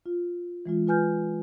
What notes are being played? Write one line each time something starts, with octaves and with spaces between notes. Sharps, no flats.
F4
E3 G#3 F4
F4 B4 G#5 F6 G6